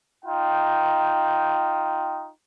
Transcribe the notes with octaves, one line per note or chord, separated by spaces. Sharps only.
D#4 F4 G5